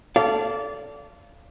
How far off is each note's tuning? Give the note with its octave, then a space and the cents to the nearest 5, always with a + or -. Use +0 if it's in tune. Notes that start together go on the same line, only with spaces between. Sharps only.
A4 +0 D5 -25 F5 -20